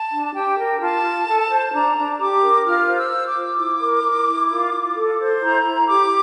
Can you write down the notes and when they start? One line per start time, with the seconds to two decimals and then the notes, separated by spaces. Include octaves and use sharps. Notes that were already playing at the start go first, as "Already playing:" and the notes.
Already playing: A5
0.10 D4
0.34 G4 G5
0.57 A#4
0.79 F4 A5
1.03 F4
1.27 A4
1.49 C5
1.72 D4 A#5
1.96 D4
2.18 G4 D6
2.42 A#4
2.64 F4 F6
2.87 C5
2.96 E6
3.10 C5
3.25 D6
3.34 F4
3.57 E4
3.80 A#4
4.03 A#4
4.27 E4
4.49 F4
4.72 F4
4.95 A4
5.19 C5
5.41 E4 A#5
5.64 E4
5.87 G4 D6